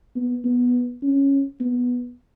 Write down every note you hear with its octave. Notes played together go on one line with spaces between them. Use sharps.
B3
B3
C#4
B3